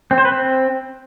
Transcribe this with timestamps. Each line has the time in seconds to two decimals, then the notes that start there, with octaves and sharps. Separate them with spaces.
0.11 C4
0.18 C5
0.25 B4
0.32 C4